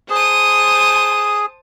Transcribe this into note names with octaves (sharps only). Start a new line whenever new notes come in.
G#4 C5 A5 D#6